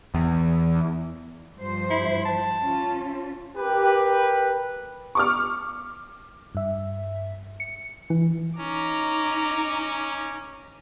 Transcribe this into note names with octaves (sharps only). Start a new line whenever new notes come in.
E2
G2 F3 C5
E4
A5
C#4 F4
G4 A#4 B4
C#6 D6 F6
G2 E5
C#7
E3
C#4 D#4 A#5 D6